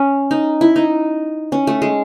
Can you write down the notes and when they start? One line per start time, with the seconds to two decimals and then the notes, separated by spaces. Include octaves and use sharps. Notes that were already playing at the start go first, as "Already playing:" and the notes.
Already playing: C#4
0.31 D#4
0.61 E4
0.76 D#4
1.52 C#4
1.67 A3
1.82 G#3